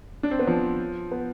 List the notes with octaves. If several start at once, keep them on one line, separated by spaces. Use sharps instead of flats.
D4
C4
B3
F3
B3